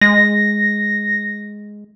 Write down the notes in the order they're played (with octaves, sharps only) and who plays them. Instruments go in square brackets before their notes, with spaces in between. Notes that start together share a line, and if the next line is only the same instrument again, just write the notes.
[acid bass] G#3 [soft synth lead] A#6